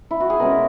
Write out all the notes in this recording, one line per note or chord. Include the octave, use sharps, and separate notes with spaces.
E4
F#4
G#4
B2 G#3 C#4 E4 A#4